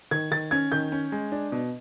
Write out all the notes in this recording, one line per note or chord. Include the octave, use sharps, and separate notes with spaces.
D#3 G#6
D#3 A6
C#4 G#6
D#3 G6
C#4
G#3
D4
B2